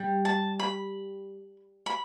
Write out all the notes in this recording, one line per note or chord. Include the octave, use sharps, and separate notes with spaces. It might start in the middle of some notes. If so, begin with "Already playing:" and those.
Already playing: G3
A5
B5
B5